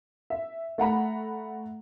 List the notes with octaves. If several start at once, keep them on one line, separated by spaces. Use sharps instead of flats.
E5
A3 F#5 A#5 B5